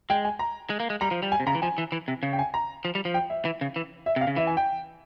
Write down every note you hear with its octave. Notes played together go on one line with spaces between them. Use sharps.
G#3 G5
G#5
A#5
G#3
A#3
G#3
G3 A#5
F3
G3
G#5
C3
C#3 A#5
E3
F3 G#5
E3
E3
C3
C#3
G5
G#5
A#5
F3
G3
F3
G5
E5
E3
C#3
E3
E5
C3 F5
C#3
E3 E5
G#5
G5